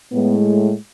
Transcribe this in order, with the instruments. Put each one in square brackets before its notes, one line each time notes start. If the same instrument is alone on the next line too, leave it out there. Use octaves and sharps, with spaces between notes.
[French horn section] A2 G#3 B3